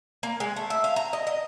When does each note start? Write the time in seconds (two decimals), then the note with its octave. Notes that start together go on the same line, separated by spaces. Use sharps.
0.23 A#3
0.40 G#3
0.56 A3
0.70 E5
0.84 F5
0.96 A#5
1.13 D#5
1.27 D#5